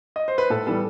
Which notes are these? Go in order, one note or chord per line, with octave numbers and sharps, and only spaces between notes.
D#5
C5
B4
A2 A4
E3 G3 B3 A4